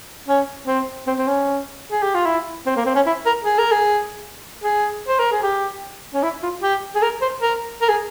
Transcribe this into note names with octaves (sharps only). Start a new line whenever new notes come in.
C#4
C4
C4
C4
C#4
G#4
G4
F4
E4
C4
A#3
C4
C#4
E4
A#4
G#4
A#4
G#4
G#4
C5
A#4
G#4
G4
C#4
E4
F4
G4
G#4
A#4
C5
A#4
A#4
G#4